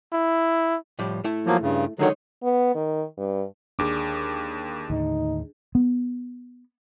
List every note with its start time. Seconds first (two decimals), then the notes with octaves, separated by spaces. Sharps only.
0.13 E4
0.99 A2 F3 G3
1.24 A3 E4
1.47 F3 F#3 A#3
1.62 G2 C#3
1.99 D3 D#3 F#3 G#3 D#4 C#5
2.43 B3
2.75 D#3
3.17 G2
3.79 D#2 D4 G#4 D6
4.90 D#2 A2 D3 D#4
5.75 B3